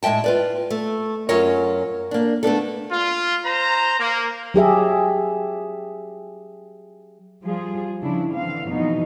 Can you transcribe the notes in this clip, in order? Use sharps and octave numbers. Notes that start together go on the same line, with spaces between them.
A2 G#3 E5 G5 A5
F4 B4 D5
A3
F#2 F#3 C#4 F4 A#4 C#5
A#3 D4
A3 B3 D4 A4
F4
C5 A#5
A#3
F#3 G4 G#4 E5
F3 G3 F4 G#4
C#3 F3 D4 E4
D3 E3 C4 F5
F2 B2 E3 B3 D#4